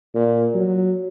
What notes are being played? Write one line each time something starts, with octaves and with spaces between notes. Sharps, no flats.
A#2
F#3